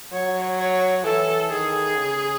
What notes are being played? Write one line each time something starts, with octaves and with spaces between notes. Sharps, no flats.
F#3 C#5
C#5
E3 A4
D#3 G#4
C#3